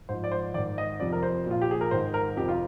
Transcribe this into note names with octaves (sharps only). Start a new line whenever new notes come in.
G#2 F3 C5
D5
C5
G#2 D#3 D5
D#5
F2 C3 F3 D5
A#4
C5
A#2 F3 F4
G4
G#4
A#4
G#2 D#3 C5
A#4
F2 C3 F3 G4
F4